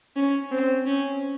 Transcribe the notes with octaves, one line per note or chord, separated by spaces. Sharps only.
C#4
C4
C#4